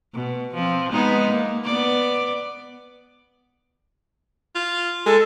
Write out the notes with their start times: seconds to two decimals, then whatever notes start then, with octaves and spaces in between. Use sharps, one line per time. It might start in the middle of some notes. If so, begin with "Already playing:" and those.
0.14 B2
0.54 F3 C4
0.92 G#3 B3 D#4
1.31 A#3
1.65 B3 D5
4.55 F4
5.06 G#3 A4